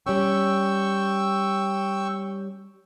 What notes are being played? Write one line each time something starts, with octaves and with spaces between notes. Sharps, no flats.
G3 C#4 G5 C#6 E6